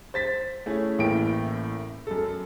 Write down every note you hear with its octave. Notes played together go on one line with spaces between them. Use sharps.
C5 A6 B6
A3 C#4 E4 G#4
A1 A2 A#3 G5 D7
F#2 A4